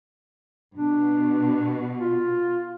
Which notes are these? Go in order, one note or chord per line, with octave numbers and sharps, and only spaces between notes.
B2 D4
F4